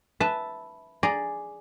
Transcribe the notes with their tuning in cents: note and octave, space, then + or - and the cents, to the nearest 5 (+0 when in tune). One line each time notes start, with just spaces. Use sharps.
B4 +0 E5 +0 A5 +0
G#4 +0 D5 +0 A#5 +0